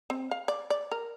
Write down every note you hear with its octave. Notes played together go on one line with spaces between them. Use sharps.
C4
F5
D5
D5
A#4